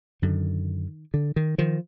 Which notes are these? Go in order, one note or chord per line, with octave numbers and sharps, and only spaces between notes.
F#2 D3 D#3
D3
D#3
D#3 F3